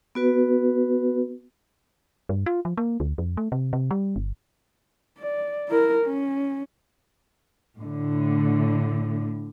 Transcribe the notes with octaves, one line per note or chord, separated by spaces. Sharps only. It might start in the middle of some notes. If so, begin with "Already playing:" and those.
B3 F#4 B4
G2
F4
F3
A#3
D2
F2
A3
C3
C3
G3
G1
D5
E4 A#4
C#4
A2 D3